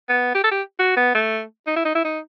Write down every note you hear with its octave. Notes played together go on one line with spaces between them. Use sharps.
B3
G4
A4
G4
F#4
B3
A3
D#4
E4
D#4
E4
D#4